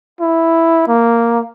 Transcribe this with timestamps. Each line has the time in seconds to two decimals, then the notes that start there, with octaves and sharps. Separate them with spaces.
0.21 E4
0.88 A#3